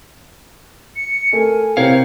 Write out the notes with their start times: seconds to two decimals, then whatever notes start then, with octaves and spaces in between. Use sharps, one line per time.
0.96 C#7
1.33 A3 A#4 G#5
1.77 C3 C4 E4 A#4 C#5 F5 G5